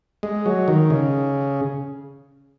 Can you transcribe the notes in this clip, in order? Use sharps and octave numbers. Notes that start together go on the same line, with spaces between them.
G#3
F#3
D#3
C#3